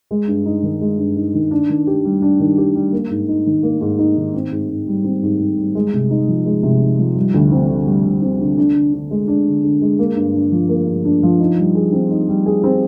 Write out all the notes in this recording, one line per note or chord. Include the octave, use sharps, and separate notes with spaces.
G#3
G2
D#4
D#3
G#3
G2
D#4
D#3
D4
D#3
G4
G3
D4
D#3
G4
G3
A#3
G#2
D#4
D#3
A#3
G#2
D#4
D#3
C4
G#2
G#2
G3
C4
G#2
G#2
G3
G#3
C3
D#4
F3
G#3
C3
D#4
F3
G3
D2
C4
D3
G3
D2
C4
D3
D4
D3
D3
G#3
D4
D3
D3
G#3
A#3
G2
D4
F3
A#3
G2
D4
F3
D#4
G3
G#4
C4
D#4
G3
G#4
C4